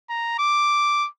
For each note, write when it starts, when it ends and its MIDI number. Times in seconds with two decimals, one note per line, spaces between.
0.10 0.39 82
0.39 1.08 86